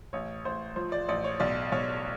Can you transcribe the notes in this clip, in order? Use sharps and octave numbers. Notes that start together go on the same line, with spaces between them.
A1 C#5
A1 C5
F3 C5
D5
A1 D5
C#5
B1 D5
B1 C#5